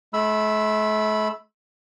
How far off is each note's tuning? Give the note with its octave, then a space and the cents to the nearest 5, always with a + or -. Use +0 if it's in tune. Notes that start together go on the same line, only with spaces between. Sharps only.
A3 -40 B5 +0 E6 +0